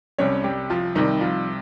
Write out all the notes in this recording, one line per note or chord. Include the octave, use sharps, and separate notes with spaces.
C2 C3 G3 C#4 C#5
G3 G4
F3 F4
C2 C3 D#3 G3 D#4
F3 F4